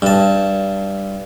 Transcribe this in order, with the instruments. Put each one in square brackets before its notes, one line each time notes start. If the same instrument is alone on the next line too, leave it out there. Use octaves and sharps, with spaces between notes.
[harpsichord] G2 A5